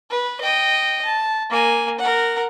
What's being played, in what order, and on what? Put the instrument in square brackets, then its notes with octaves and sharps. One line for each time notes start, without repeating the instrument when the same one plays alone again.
[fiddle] B4
D#5 G5
A5
A#3 G#5
A#4 F#5